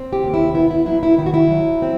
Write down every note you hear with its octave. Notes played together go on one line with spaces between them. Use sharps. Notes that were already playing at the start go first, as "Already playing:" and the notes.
Already playing: C4
G4
D#2
E4
B3 E4
E4
F#3 E4
E4
D#3 E4
F#4
E4
F#3
C4